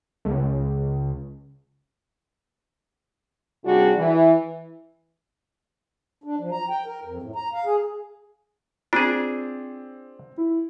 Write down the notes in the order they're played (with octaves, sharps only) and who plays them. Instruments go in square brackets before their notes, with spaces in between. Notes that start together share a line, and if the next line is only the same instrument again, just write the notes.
[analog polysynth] C#2
[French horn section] D#2 C3 G3 D4 F#4 G#4
E3
[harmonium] D4
F3
A#5
G5
A#4
F2
A2
A#5
F5
G#4
[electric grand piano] C4 [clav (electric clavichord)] D4 G#4 [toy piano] F4
[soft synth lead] E4